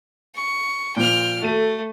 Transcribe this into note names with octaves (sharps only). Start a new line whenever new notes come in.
C#6
A#2 F3 G5 F6
A3 F#4 A4 D#7